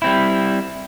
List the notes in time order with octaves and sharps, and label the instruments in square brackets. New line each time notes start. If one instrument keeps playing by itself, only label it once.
[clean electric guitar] G3 C4 E4